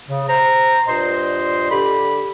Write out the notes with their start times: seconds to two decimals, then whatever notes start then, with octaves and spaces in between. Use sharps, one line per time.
0.09 C#3
0.29 C5 A#5
0.88 G2 A#2 C5 D#5 C6
1.71 D3 G4 B5